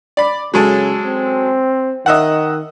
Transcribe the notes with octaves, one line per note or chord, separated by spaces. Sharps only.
D5 B5
C#3 F#3 G#3 A4
C4
D#3 D#5 E5 F#5